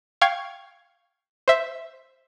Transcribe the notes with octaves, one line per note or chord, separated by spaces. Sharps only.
F5 G5 C#6 G#6
C5 E5